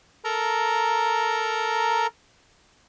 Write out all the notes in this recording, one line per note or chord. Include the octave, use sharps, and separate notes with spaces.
A4 A#4 A#5